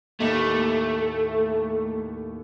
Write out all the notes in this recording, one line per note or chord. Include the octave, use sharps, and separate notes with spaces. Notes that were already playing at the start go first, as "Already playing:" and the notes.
D#2 A2 A3